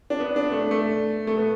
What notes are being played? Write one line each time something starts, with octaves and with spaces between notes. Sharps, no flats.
D4
B3
D4
A3
A3
A3
B3